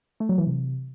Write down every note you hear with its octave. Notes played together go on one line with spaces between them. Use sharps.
A3
F#3
E3
C3